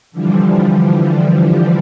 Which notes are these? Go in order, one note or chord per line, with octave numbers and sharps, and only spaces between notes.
D3 E3 F3 G3